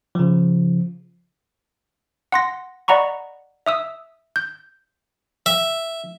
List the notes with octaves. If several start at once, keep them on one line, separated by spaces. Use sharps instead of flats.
C#3 F3
F#5 C6 A#6
D5 D#5 F#5 A#5 B5 C#6
E5 D#6 E6
G6
E5